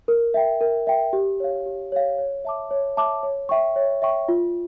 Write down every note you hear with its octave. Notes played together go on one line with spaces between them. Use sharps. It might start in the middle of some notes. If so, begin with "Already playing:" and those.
A#4
E5 G5
A#4
E5 G5
G4
C#5 F5
G4
C#5 F5
C#5
E5 A5 D6
C#5
E5 A5 D6
C#5
E5 G5 C#6
C#5
E5 G5 C#6
F4